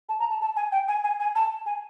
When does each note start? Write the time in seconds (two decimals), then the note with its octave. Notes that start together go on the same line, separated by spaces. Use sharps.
0.09 A5
0.20 A#5
0.30 A5
0.41 A5
0.56 G#5
0.72 G5
0.88 G#5
1.04 G#5
1.20 G#5
1.35 A5
1.66 G#5